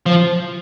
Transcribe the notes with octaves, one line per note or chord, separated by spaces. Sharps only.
F3